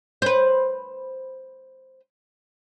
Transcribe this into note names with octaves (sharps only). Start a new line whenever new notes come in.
B4 C5